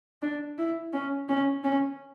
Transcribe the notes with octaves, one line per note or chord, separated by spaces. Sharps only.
D4
E4
C#4
C#4
C#4